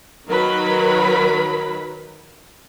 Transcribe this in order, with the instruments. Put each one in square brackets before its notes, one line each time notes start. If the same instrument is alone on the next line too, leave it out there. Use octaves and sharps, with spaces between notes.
[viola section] D#3 F#3 A#4 B4 B5